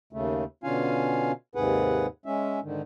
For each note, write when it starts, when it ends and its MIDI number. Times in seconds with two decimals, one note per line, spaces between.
0.13 0.44 39
0.13 0.44 49
0.13 0.44 57
0.63 1.32 47
0.63 1.32 50
0.63 1.32 61
0.63 1.32 65
0.63 1.32 77
0.63 1.32 80
1.55 2.06 39
1.55 2.06 44
1.55 2.06 48
1.55 2.06 68
1.55 2.06 71
1.55 2.06 78
2.26 2.60 56
2.26 2.60 61
2.26 2.60 76
2.63 2.82 44
2.63 2.82 50
2.63 2.82 51